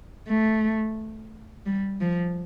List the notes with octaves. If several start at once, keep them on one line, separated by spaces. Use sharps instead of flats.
A3
G3
F3